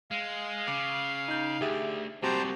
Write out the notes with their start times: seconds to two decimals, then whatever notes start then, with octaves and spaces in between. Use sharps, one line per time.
0.11 G#3 F5
0.68 C#3 D6
1.28 D#4 G6
1.61 D2 G4 G#4 E5
2.23 C2 A#2 C4 F#4 G4 C5 A5 A#5